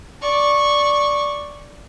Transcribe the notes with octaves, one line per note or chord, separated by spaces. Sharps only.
D5 C#6